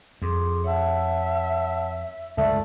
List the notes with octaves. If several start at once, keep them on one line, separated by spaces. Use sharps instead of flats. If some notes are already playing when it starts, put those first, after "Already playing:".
F2 G#4 C6 D6
C#5 E5 F#5 A5
C#2 G2 A3 D5